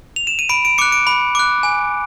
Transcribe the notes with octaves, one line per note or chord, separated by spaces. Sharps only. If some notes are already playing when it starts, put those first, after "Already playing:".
F7
E7
D#7
B5 D7
D7
D6 F#6 C#7
D7
B5
D6 F#6
G#5